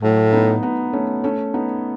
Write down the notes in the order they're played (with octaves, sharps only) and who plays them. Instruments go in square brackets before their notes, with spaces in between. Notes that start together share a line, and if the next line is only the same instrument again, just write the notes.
[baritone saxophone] A2 [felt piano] F#3 A3
[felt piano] B3 D#4
B3 D#4
A3 C#4
A3 C#4
B3 D#4